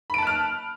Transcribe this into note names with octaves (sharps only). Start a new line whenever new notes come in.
A5 B5 F6 F#6 D7